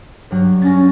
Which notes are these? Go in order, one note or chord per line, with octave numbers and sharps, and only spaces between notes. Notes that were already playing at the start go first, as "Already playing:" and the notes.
G2 F#3
C#4 A6 A#6